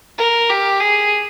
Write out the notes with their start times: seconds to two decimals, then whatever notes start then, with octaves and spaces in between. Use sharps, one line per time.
0.18 A#4
0.50 G4
0.80 G#4